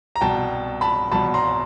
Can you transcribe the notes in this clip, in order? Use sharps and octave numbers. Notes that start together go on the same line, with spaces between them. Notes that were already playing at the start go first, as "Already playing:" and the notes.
A#5
C2 B2 G5 A5
A5 B5
C2 B2 A5 B5
A#5 C6